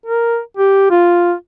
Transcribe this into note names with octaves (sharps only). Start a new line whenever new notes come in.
A#4
G4
F4